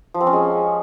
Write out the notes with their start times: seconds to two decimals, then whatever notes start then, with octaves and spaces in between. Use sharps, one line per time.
0.14 F3
0.21 C4
0.27 C#4
0.33 G#3